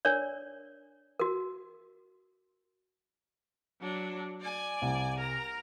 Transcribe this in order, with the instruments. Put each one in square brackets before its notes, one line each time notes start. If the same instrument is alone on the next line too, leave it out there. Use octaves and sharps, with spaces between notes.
[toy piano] D4 A#4 C#5 D5
F#4 A#4
[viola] F#3 D4
D5 G#5
[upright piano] C2
[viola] A#4 A#5